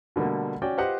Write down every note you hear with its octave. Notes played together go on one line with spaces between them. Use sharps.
B2 D3 G3 A3 A#3
C#4 F#4 D5 G5
F4 G4 B4 C5 D#5 F#5